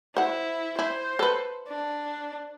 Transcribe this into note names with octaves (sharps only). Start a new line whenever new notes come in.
E4 C5 F#5
E4 C5
A4 B4
D4